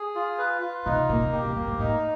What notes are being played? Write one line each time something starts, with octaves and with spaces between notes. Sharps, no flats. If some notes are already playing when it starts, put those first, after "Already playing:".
Already playing: G#4
F4
B4
F4
B2 D#4
C3
A#2 A#3
B2
B2 G4
B2
A2 A#3
G#2
A2 D#4